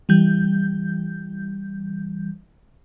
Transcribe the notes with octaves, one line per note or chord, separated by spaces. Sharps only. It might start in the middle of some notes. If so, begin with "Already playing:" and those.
E3 G3 G6